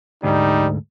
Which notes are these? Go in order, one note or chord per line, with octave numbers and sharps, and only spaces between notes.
D2 G#2 G3 D#4